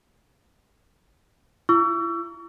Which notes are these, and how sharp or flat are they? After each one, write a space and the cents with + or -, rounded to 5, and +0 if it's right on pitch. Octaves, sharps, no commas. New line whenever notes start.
E4 +35 C#6 +35 E6 +30